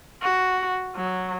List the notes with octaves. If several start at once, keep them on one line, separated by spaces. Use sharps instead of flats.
F#4
F#3